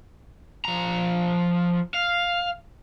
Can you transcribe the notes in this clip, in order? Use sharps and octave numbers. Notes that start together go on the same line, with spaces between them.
F3 A#5
F5